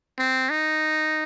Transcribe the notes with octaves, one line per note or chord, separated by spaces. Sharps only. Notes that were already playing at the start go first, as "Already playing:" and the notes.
C4
D#4